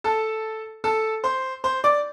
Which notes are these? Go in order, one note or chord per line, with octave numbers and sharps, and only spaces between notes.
A4 A5
A4 A5
C5 C6
C5 C6
D5 D6